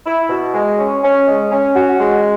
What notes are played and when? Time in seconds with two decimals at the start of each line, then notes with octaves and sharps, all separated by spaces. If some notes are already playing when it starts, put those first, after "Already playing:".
0.06 E4
0.30 B2
0.54 G#3
0.78 C#4
1.03 C#4
1.27 G#3
1.52 C#4
1.76 F#4
2.00 G#3